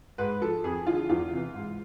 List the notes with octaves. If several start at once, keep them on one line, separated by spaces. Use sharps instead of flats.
G#2 B4
F3 A4
F2 G#4
D3 F3 F4
E2 F4
C3 E3
G#2